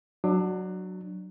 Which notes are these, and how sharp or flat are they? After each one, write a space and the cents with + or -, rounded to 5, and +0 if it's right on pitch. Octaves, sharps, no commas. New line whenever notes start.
F#3 +0 D4 +25